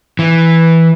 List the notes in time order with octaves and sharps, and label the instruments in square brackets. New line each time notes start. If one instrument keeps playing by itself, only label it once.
[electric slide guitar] E3